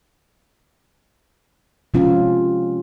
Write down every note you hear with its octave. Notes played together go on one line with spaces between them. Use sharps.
C3 F3 G#3 C4 C#4 F4